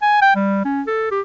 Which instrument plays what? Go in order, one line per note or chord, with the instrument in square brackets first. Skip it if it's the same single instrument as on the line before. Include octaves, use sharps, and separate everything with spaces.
[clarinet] G#5
G5
G3
C#4
A4
G4